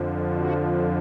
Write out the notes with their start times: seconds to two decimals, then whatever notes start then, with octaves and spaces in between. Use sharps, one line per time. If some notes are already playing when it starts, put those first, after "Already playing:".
Already playing: F2 D3 F3
0.37 F#4